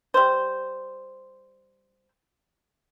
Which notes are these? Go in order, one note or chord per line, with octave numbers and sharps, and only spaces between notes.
G3 C5